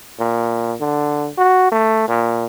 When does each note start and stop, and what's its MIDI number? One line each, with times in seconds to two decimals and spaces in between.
0.19 0.74 46
0.80 1.29 50
1.38 1.71 66
1.72 2.07 57
2.08 2.46 46